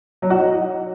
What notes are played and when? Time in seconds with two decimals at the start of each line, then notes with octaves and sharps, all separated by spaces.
0.22 F#3
0.30 F#4
0.38 D#4